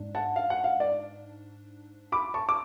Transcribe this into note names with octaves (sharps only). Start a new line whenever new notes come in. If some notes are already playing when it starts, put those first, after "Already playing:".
Already playing: G#2 D4
F#5 A5
F5
F#5
F5
D5
B5 D6
A5 C#6
D6